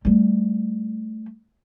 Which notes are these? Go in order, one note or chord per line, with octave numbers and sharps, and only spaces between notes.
G3 A3